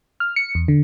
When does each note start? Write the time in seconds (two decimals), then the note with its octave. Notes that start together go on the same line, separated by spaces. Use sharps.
0.20 F6
0.36 C#7
0.55 E2
0.68 D3